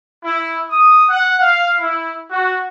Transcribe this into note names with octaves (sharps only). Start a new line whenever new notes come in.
E4
D#6
F#5
F5
E4
F#4